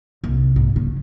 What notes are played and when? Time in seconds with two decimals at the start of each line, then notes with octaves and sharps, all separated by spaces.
0.24 C2
0.56 G#2
0.76 C#3